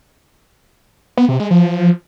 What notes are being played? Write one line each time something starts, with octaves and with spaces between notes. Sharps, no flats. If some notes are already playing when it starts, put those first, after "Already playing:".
B3
C3
G#3
F3